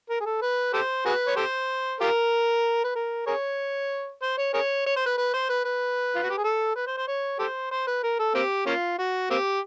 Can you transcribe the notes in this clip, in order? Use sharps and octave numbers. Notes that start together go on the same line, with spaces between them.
A#4
G#4
A4
B4
G4 A4 C5
F#4 G#4 B4
C#5
G4 A4 C5
F4 G4 A#4
B4
A#4
G#4 A#4 C#5
C5
C#5
G#4 A#4 C#5
C#5
C5
B4
B4
C5
B4
B4
F4
F#4
G4
G#4
A4
B4
C5
C5
C#5
G4 A4 C5
C5
B4
A#4
A4
A#3 C4 G4
A#3 C#4 F4
F#4
A#3 C4 G4